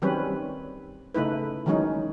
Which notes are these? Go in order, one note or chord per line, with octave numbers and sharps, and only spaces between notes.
D#3 F#3 G3 C4 C#4 B4
C#3 A3 D#4 E4 B4
D#3 E3 F#3 G#3 C#4 D#4